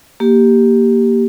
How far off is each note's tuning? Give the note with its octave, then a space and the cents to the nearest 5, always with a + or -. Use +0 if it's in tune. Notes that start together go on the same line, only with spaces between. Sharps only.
A#3 +0 G4 +0